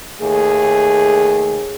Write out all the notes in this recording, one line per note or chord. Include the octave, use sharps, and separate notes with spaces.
D#2 A3 G#4